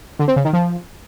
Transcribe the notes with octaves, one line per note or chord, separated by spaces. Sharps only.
D3
C4
C#3
D#3
F3